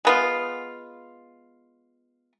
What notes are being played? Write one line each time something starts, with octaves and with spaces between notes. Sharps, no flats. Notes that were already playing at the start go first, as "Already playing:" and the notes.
G#3 B3 F4